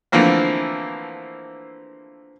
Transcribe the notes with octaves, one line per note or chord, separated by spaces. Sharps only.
D3 E3 F3 A3 A#3 C4